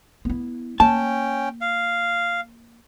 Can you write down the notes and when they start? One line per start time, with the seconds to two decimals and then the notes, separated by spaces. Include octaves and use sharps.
0.25 B3 E4
0.80 A#3 C#4 G5 A5
1.61 F5